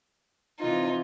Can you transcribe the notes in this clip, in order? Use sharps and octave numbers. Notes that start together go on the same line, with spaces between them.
C3 E3 D#4 F4